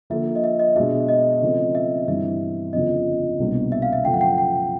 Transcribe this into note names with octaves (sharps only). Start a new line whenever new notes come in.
D3 F3 A#3 E5
D#5
E5
D#5
B2 G#3 B3 D4 F#4 E5
D#5
C#3 F3 A3 C4
E5
G2 E3 G3 C4 E5
G1 F2 C#3 F3 D#5
C2 B2 G3 A#3 D4
E5
F5
E5
F#2 C#3 F3 A3 G5
F#5
G5
G5